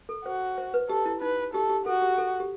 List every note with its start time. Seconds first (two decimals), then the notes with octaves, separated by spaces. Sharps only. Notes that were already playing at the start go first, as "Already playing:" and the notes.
0.09 A4
0.25 F#4 C5
0.58 C5
0.74 B4
0.89 G4 A4
1.06 E4
1.21 D#4 B4
1.54 G4 A4
1.69 G4
1.86 F#4 A4
2.02 G4
2.18 A4
2.40 G4